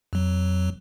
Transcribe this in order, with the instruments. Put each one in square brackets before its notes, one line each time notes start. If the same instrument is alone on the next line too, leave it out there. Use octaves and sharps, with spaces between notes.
[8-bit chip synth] F2 F#3